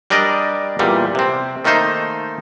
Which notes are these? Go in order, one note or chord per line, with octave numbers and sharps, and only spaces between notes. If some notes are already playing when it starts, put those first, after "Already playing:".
G3 D4 A#4 D5 D#5
E2 A#2 G3
C3 C4
D#3 A3 A#3 D#4 C5